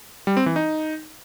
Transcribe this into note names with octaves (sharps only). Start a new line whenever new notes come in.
G3
C4
E3
D#4